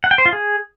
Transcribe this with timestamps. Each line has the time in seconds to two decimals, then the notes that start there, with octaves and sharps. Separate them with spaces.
0.04 F#5
0.11 G5
0.18 C5
0.26 F4
0.33 G#4